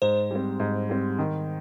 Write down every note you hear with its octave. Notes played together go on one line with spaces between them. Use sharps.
G#2 C5
G3 C4
G#2
G3 C4
D#3